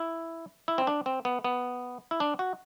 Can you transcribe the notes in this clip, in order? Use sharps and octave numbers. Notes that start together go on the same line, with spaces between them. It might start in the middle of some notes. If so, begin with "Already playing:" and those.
Already playing: E4
E4
C4
D4
C4
B3
B3
E4
D4
F#4